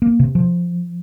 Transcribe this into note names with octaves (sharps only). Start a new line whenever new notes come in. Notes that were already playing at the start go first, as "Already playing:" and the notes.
A#3
C3
F3